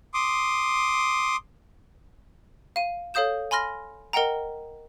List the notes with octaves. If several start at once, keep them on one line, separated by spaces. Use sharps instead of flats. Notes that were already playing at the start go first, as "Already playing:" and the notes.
C6 D6 D#6
F5 D#7
A4 C#5 F5 D#6 G6 E7
G#5 B5 C6 F6 A#6
A#4 D#5 F#5 G5 A#5